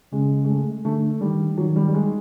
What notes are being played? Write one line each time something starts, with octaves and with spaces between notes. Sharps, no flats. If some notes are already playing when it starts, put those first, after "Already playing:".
C#3 G#3
G#3
A3
D3 A3
D#3 G3
D#3 F#3
G3
G3
G#3